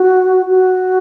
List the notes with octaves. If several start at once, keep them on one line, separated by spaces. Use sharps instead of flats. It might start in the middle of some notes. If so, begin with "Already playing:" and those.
Already playing: F#4
F#4